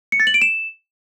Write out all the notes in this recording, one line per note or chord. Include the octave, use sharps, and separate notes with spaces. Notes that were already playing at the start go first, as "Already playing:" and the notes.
C#7
A6
F#7
D7
E7